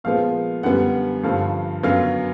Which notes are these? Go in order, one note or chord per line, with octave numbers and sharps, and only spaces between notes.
A#2 F3 G#3 B3 F5
F#2 D3 G3 B3 F#5
G2 D3 F3 F5
F#2 D3 F#3 B3 F5